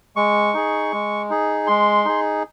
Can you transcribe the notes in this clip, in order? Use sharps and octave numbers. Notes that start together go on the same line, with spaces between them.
G#3 C#6
D#4 G#4
G#3
D#4 G#4
G#3 C6
D#4 G#4